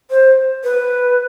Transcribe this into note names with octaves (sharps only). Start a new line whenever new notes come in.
C5
B4